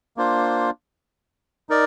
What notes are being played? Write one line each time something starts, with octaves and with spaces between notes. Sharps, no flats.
A#3 D4 F4 C5
D#4 A#4 D5